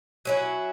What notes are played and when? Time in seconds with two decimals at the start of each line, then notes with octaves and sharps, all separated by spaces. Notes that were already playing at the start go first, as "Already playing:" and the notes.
0.25 F#3 C#4 E4